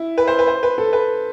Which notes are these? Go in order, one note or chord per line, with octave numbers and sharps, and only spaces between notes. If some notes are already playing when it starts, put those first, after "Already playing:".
Already playing: E4
B4
C5
B4
C5
B4
A4
B4